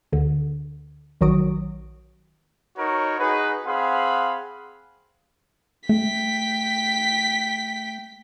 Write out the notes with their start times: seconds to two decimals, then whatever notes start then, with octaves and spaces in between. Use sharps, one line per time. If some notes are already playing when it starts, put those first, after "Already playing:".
0.12 D2 D3
1.21 A#1 D#3 F#3 F#4 D#6 D7
2.76 D#4 F#4 A#4 B4 C#5
3.19 D#4 F#4 G#4 B4
3.65 C4 G#4 F5 F#5 B5 C6
5.89 A3 G5 B6